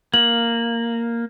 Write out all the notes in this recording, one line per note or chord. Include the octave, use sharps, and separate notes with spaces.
A#3 F#7